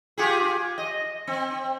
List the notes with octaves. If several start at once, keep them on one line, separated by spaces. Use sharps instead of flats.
F4 G4 G#4
D#5
C4